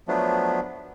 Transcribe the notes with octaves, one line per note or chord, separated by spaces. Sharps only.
F3 F#3 A3 B3 D4